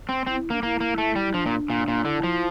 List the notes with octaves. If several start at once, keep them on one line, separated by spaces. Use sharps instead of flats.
C4
C4 E4
A#3 D4
A#3 E4
A#3
A3
G3
F3 D4
A#2
A#2
A#2
D3 E4
F3